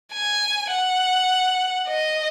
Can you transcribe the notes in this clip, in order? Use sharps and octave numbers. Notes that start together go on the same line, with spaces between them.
G#5
F#5
D#5